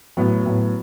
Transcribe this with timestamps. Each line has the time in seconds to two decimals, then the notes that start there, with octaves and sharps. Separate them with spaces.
0.17 A2 F#3 B3
0.46 A2 F#3 B3